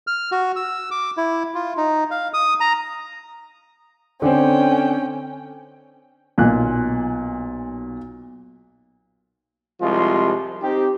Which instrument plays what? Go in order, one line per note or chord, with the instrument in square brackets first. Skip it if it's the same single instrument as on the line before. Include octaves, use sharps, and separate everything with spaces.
[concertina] F6
F#4
E6
D6
E4
F4
D#4
F5
D#6
A#5
[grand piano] D3 C4 [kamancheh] C#4 G5
[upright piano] B1 G#5 F#6 [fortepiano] A#2
[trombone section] C2 C3 F3 G#3 F4
C4 D#4 G4